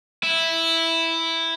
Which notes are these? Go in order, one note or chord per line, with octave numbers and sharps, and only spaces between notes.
E4